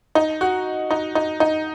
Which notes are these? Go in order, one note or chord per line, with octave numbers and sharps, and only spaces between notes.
D#4
F#4
D#4
D#4
D#4